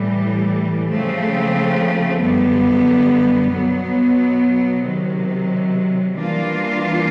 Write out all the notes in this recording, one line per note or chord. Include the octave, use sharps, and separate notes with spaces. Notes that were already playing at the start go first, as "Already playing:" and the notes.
Already playing: A2 E3 G3
C#3 F3 A3 C4
F#2 D3 G3 B3
B2 F#3 B3
C3 D#3 F#3
E3 G3 A#3 D4 F4